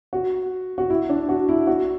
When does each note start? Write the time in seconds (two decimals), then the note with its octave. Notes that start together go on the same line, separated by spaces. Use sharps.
0.13 F#4
0.78 F#4
0.90 E4
1.09 D4
1.29 F#4
1.49 E4
1.67 F#4